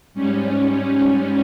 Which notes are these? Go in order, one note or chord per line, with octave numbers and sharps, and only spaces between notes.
G#2 G3 C#4